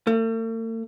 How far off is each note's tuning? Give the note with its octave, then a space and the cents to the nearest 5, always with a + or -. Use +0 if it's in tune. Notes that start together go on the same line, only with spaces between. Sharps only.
A3 +45